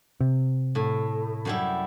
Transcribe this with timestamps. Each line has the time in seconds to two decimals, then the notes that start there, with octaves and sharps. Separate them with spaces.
0.21 C3
0.75 A2
1.45 F#2 G3 E4